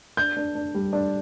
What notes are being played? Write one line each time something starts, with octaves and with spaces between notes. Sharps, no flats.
D4 G6
D4
D4
G3
D4